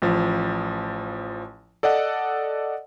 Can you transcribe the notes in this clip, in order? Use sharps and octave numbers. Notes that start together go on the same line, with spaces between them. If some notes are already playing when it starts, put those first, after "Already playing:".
A1 F3
A4 D5 D#5 F#5